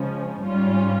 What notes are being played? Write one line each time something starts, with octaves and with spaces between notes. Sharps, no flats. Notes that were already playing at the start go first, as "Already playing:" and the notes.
Already playing: C#3 F3 G#3 C#4
G#2 G3 C#4 F4